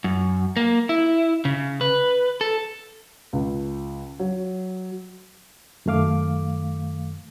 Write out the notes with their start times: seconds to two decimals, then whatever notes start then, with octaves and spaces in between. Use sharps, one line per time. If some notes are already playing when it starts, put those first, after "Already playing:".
0.04 F#2
0.57 A#3
0.89 E4
1.45 C#3
1.81 B4
2.41 A4
3.33 C#2
4.20 F#3
5.86 F#2 D#3 A3 F5 D6